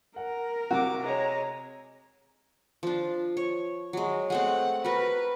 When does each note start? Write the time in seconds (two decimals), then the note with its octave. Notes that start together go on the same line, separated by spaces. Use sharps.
0.16 A#4 F#5
0.71 C3 C4 F#4 F#5 D6
1.03 G#3 C#5 A#5
2.83 F3 D4
3.37 C#5
3.93 F#3 G#3
4.30 G#3 A3 C4 F#5
4.84 F#4 A#4 B4